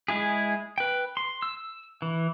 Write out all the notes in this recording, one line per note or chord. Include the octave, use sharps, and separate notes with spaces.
G#3 E4 G#4
B4 G5
C6
E6
E3